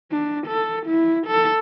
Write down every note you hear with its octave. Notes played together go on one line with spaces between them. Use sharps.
D4
A4
E4
A4